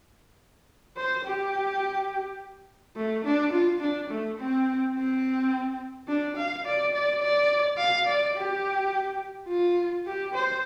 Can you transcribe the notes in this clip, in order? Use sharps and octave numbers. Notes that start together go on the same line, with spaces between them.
C5
G4
A3
D4
F4
D4
A3
C4
C4
D4
F5
D5
D5
D5
F5
D5
G4
F4
G4
C5